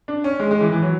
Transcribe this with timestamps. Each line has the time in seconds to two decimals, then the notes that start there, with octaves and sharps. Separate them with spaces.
0.08 D4
0.24 C#4
0.40 G#3
0.51 G#3
0.61 E3
0.72 E3
0.82 F#3